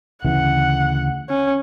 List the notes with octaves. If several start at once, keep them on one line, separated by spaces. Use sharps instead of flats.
D2 C#3 E3 F#5
C#4